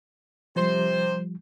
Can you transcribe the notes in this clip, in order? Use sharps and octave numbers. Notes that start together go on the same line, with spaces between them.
C3 F3 G3 C5